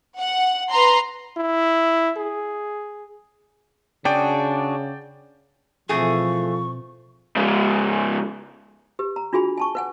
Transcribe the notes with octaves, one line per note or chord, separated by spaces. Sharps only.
F#5
B4 A#5 C6
E4
G#4
C#3 D4 F#4 G#4 D5 G5
B2 E3 F3 A3 C4 G#4 F#5 C#6
G#2 C#3
G4 B4
A#5
D4 F4 F#4 G#4 G#5 B5
G#5 A5 C#6
B4 F#5 G#5